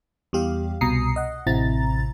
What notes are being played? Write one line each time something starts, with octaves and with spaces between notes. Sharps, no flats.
E2 G3 G4 F5
C2 B2 A#5 D#6 C7 C#7
D#5 F#5
A1 C3 C4 E4 A#5 A6